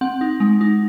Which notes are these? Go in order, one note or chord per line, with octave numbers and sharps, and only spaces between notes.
C4 F#5
D#4
G#3
D#4